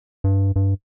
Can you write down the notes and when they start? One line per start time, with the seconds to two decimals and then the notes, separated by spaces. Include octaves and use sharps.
0.24 G2
0.56 G2